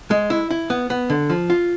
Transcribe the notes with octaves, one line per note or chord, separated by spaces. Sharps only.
G#3
E4
E4
B3
B3
D3
F3
F4